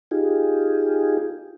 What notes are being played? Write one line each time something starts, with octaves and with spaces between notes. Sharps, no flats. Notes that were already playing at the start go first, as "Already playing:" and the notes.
D#4 F4 G4 G#4